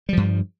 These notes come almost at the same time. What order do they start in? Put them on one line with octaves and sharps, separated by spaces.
G3 F3 G2